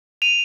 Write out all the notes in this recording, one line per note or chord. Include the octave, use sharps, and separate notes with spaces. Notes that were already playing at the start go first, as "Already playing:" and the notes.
D#7 F7